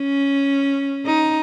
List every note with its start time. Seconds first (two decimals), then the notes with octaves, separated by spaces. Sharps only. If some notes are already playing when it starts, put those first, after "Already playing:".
Already playing: C#4
1.06 D#4